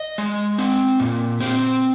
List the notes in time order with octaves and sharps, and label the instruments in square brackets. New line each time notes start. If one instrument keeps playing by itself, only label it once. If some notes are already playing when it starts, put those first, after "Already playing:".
Already playing: [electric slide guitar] D#5
G#3
C4
A#2
C4